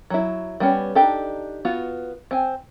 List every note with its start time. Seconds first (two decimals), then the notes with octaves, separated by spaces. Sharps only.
0.10 F#3 E4
0.60 G3 B3 C#4
0.95 D4 D#4 G4 A4
1.65 B3 F4 F#4
2.31 C4 G#5